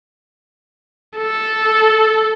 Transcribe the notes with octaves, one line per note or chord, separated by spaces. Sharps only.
A4